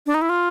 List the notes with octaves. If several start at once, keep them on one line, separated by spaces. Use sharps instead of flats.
D4
D#4
E4
F4